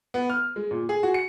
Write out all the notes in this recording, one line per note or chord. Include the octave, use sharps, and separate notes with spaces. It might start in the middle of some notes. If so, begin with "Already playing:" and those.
B3
F6
G#3
A#2
G#4
F#4
C#7